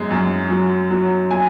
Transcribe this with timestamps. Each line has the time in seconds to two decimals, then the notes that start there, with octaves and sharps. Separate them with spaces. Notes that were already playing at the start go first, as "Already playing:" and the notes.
Already playing: F#2 G#3
0.11 F#2
0.50 F#3
0.91 F#3
1.31 F#3 G#5